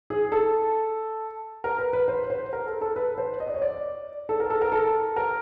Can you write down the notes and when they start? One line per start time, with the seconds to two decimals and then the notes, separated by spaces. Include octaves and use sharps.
0.10 G#4
0.32 A4
1.64 A#4
1.79 B4
1.93 B4
2.08 C5
2.30 C5
2.53 A#4
2.66 A4
2.81 A4
2.96 B4
3.18 C5
3.40 D#5
3.47 D5
3.54 C#5
3.62 D5
4.29 A4
4.40 A#4
4.50 A4
4.61 A#4
4.72 A4
5.16 A#4